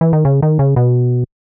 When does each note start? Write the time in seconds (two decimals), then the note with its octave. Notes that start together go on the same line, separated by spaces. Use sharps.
0.01 E3
0.13 D#3
0.25 C#3
0.42 D#3
0.59 C#3
0.76 B2